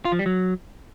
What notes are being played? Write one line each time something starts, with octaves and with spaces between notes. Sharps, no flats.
F4
F3
G3
F#3